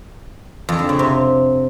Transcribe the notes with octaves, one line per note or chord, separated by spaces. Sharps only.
F2
D3
C#3
C3